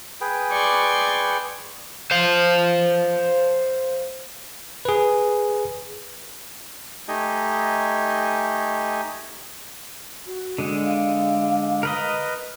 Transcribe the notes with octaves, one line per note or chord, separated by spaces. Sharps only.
G#4 B4 G5
D5 C6 C#6
C5 F5
G#4 B4
A3 D#4 G4 D#5 G#5
F#4
D3 G#3
F5
A#4 B4 D#5